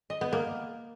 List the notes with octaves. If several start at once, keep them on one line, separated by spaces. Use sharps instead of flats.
D#5
B3
A#3